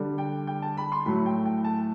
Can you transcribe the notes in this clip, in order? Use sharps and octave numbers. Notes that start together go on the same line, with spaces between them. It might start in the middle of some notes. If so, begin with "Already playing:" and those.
Already playing: D3 G3
G5
G5
A5
B5
C6
A2 F#3 A3 B5
G5
G5
A5